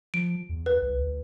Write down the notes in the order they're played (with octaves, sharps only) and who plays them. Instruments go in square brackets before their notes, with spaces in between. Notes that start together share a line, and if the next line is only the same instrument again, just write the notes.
[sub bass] F3 [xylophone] D7
[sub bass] E2
[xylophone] B4
[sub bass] C2
D2